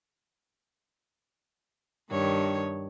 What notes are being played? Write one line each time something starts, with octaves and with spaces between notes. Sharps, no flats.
G2 D#3 C#5